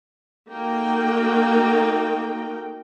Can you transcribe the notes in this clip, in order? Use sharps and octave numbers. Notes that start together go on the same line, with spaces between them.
A#3 D#4 F#4 A4 A#4 G5